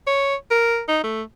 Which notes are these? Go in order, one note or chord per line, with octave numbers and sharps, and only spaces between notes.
C#5
A#4
D#4
A3